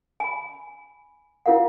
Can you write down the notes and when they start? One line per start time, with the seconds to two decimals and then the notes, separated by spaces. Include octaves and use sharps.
0.20 G#5 B5
1.46 E4 F4 A#4 F5 F#5